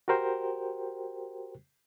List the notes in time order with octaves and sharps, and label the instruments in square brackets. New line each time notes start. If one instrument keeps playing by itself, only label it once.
[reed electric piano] F#4 G4 A#4 C5 G5